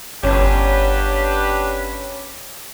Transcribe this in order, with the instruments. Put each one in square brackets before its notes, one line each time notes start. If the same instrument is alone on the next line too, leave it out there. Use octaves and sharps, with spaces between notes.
[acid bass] G1 [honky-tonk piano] C#4 [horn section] D4 G4 B4